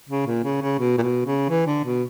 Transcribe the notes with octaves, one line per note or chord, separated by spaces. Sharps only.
C#3
A#2
C#3
C#3
B2
A#2
B2
C#3
E3
D3
B2